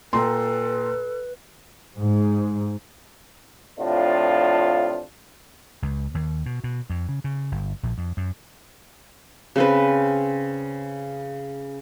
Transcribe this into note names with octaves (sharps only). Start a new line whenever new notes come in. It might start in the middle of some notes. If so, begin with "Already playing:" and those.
A#2 A4 B4 G5 A#5 C6
G#2
A2 C3 F3 D4 F4
C#2
D#2
B2
B2
F2
C#3
C#3
G1
A#1
F2
F#2
C#3 C4 B4